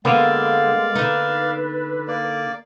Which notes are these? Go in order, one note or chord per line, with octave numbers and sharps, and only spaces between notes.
D3 G#3 A#3 B3 D5 F5
D3 D#4 B4
A#3 D5